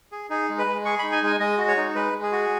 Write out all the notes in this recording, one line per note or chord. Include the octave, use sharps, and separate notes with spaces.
G#4
D#4 G#4
G#3
B4
G#3
G#4 C#6
D#4 B5
G#5
G#3 G#5
G#3 D#5
F#4
C#5
D#4
G#3 B4
G#3
G#4
F#4